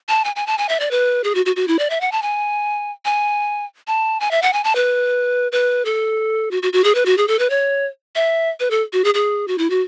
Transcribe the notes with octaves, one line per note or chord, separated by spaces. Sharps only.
A5
G#5
G#5
A5
G#5
E5
D5
B4
G#4
F#4
F#4
F#4
E4
D5
E5
F#5
A5
G#5
G#5
A5
G#5
E5
F#5
G#5
A5
B4
B4
A4
F#4
F#4
F#4
G#4
B4
F#4
G#4
A4
B4
C#5
E5
B4
A4
F#4
G#4
G#4
F#4
E4
F#4